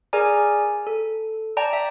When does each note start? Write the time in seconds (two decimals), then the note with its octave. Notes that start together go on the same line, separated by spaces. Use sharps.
0.13 G#4 A#4 D5 G#5 A#5
0.87 A4
1.57 D5 G5 A5 A#5
1.73 E5